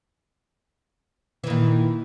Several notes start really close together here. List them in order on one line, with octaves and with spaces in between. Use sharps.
E3 D#3 A#2